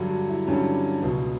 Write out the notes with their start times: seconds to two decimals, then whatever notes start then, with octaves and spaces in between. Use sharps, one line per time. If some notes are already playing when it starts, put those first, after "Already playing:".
Already playing: G2 D3 F#3
0.10 F#4
0.29 E4
0.47 G2 D3 F#3 C#4
1.01 C#2 B2 F#3 B3